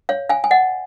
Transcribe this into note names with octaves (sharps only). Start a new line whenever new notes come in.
C#5 F5
F5 G#5
G#5
D#5 F#5